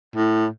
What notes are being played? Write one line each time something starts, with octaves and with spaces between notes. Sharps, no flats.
A2